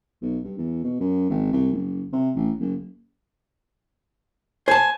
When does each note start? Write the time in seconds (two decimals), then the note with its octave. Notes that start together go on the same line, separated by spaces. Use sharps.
0.22 B1
0.44 G2
0.58 E2
0.84 B2
1.00 F#2
1.30 G#1
1.52 C2
1.72 F#1
2.12 C3
2.35 A1
2.59 F#1
4.68 C5 G#5 A5